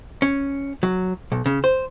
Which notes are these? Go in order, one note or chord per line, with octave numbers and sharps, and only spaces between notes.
C#4
F#3
B1
C#3
C5